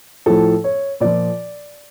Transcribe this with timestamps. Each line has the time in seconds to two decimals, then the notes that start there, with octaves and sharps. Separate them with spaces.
0.26 A2 F3 A4
0.64 C#5
1.00 A#2 F3 D5